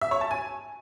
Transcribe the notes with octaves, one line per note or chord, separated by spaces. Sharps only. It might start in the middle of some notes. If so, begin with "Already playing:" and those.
E5
C#5
A5
G#5